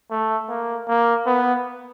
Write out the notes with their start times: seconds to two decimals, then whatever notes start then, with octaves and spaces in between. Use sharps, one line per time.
0.11 A3
0.49 A#3
0.88 A#3
1.26 B3